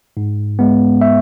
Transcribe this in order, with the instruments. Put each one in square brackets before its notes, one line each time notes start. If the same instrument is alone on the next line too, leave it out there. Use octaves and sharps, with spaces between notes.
[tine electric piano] G#2
G#3 B3
E5